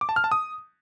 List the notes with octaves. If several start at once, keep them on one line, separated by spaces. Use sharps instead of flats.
D6
A5
F6
A5
D#6